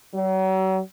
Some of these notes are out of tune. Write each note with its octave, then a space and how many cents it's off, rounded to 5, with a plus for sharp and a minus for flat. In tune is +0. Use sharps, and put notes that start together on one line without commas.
F#3 +40